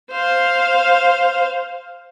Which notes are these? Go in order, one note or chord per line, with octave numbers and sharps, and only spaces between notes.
C5 F5